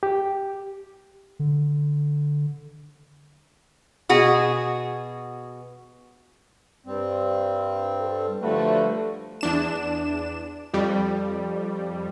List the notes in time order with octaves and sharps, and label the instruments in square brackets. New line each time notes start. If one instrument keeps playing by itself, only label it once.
[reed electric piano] G4
[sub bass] D3
[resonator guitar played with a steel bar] B2 F#4 G#4
[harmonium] G2 G3 C4
[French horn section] A4
[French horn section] D3 F3 A3 [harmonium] G3 F#4 B4
[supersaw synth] E2 D4 E7
F2 G3